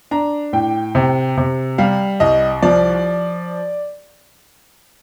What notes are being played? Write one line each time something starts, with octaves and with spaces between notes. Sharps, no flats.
D4 A#5
A2 G5
C3
C3
G3 F5
C2 D#5
F3 D5